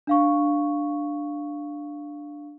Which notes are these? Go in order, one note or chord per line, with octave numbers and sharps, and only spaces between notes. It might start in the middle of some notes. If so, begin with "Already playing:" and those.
D4 F5 C#6